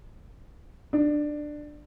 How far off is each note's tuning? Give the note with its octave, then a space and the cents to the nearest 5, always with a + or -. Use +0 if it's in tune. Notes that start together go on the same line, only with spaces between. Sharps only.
D4 +15